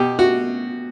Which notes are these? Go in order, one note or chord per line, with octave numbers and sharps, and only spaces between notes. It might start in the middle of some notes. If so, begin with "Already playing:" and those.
Already playing: B2 G4
F#4